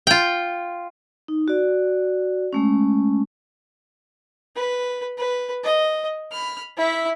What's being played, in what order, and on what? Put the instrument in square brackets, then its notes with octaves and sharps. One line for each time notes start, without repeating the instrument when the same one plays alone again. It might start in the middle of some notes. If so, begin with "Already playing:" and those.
[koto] F4 G5
[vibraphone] D#4
F#4 D5
G#3 A3 C#4
[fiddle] B4
B4
D#5
B5 F6
E4 E5